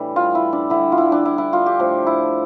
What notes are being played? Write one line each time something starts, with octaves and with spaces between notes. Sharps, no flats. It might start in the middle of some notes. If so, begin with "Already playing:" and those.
Already playing: A2 E3 G3 A3 D4
F4
E4
D4
D3 G3 E4
F4
E4
D4
E4
E4
F4
G4
A2 F3 A3
E4